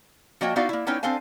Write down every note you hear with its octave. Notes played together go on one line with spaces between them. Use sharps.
F3 A#3 F#4 C#5 D#5 G5
B3 D#4 E4 F#4 D5 F5
A#3 E4
B3 C#4 D#4 E4 C#5 G5
C4 D4 A4 C5 F5 G#5